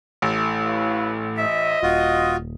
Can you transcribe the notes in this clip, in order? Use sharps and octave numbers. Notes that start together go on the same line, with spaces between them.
A1 A2
B4 C#5 F5
C5 D#5 E5
D#1 F4 F#4